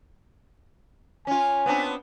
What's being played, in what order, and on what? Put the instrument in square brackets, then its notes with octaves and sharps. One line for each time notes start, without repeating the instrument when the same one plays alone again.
[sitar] C#4 F4 [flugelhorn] G#5
[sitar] B3 C4 D4